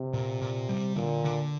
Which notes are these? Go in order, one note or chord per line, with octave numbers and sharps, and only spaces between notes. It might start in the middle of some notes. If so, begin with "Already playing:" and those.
Already playing: C3
A#2
A#2
G3
A#2 D3
D3